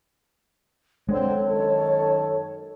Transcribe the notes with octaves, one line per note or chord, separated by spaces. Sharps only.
D3 G#3 C4 C#5
F#2 D#3 A4